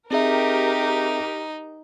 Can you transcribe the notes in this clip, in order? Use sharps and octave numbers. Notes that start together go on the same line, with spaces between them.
C4 D#4 G4 G#4 A#4 E5